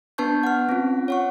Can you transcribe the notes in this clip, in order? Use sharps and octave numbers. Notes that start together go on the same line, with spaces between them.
B3 D4 B4 A5 C#6 G6
F#5 F6
C4 C#4 F4
C#5 F#5 C#6